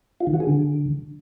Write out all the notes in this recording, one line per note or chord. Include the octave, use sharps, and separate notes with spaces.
F4
D#3
F#4
G#4
D3